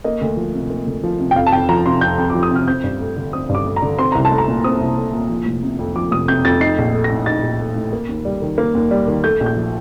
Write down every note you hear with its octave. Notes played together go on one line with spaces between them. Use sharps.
A#3 D#5
D2
F3
C3
A#3
D2
F3
C3
G5
F2 F5
A5
F2 G5
F3 A#5
C3 C6
F2 G6
F2
F3 D6
D#6
C3 F6
C4 G6
G2
A3
D3
C4 D#6
G2
D6
A3
A#5
D3
C4 C6
C2 A#5
A5
A3
A#5
A#2
C4 D#6
C2
A3
A#2
F3
F1
C3
F2
F3 D6
F1 D#6
C3 G6
F2 A6
D#4 C7
A#1
A3
A#6
A2
D#4 A6
A#1
A3
A2
A#3
D#2
G3
D#3
A#3
D#2
G3
D#3
A3 G6
A#1
G6
F3